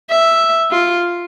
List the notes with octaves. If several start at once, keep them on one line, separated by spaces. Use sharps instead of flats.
E5
F4